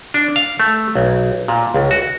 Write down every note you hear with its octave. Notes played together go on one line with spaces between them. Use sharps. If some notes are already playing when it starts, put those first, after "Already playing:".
D4
F5
A3
B1
A#2
C#2
F#4